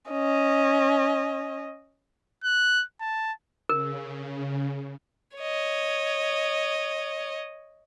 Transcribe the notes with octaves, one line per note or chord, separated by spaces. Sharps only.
C#4 D#5
F#6
A5
C#3 A#4
C#5 D#5